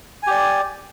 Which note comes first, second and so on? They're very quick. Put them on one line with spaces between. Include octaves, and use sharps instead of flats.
G#5 G4 D5